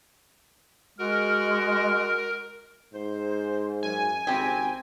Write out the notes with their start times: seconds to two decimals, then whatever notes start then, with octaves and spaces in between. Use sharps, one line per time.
0.99 G#3 F#4 A#4
2.94 G#2 C5
3.83 F#2 G#5
4.27 G#1 C#3 C4 G4